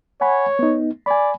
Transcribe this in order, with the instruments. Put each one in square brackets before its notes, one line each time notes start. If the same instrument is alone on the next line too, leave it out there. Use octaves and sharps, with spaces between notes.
[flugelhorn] C#5 [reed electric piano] F#5 G#5 B5
[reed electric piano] B3 D#4
[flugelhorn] D5 [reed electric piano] G#5 B5